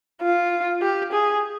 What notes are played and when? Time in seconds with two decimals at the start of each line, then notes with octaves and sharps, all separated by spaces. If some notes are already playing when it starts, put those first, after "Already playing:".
0.22 F4
0.81 G4
1.12 G#4